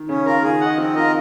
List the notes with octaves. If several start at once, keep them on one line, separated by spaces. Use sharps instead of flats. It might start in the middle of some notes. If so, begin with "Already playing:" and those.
Already playing: D#3
C#3 C#4
F4 A#4
D#3 G#4
D#5 F#5
F3 C4
F4 A#4 D#5